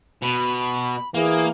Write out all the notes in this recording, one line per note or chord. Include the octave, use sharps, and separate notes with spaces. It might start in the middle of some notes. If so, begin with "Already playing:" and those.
B2 B5
E3 A#3 G#4